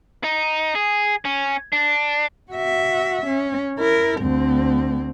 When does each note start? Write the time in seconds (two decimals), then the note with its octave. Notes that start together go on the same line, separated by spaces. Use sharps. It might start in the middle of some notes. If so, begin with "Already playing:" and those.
0.24 D#4
0.75 G#4
1.25 C#4
1.73 D4
2.51 F#4 E5
3.26 C#4
3.79 E4 A#4
4.21 D2 C4